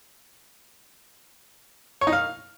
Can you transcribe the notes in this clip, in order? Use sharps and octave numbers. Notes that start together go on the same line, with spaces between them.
C#5
D#4
F5